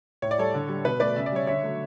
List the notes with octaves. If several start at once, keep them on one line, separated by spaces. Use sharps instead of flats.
A2 C#5
D5
G3 A4 C#5
D3
G3
B2 B4
A3 B4 D5
C#3 E5
D5
G3 C#5 E5
D3 C#5 E5
F#3 A3